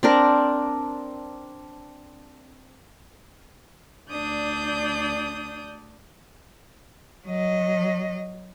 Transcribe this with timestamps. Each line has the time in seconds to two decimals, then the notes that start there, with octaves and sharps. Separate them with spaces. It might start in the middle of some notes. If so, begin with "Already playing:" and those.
0.03 C4 D4 A#4
4.10 D2 D4 D5 D#6 G6
7.27 F#3 D#5